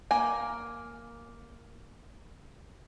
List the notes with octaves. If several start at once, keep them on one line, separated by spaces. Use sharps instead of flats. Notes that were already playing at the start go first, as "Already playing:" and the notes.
A#3 G#5